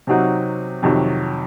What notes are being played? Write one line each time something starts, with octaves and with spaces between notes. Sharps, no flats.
C3 F#3 C4 D#4 F#4
F2 C3 D#3 F#3